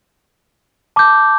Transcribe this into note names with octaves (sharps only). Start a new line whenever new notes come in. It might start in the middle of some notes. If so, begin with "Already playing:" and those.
A5 D6 G6